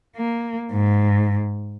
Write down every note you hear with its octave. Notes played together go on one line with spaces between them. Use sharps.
A#3
G#2